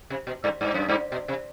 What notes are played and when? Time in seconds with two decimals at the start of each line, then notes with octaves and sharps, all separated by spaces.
0.10 C3
0.27 B2
0.44 G2
0.61 G2
0.74 F#2
0.89 G2
1.12 B2
1.28 C3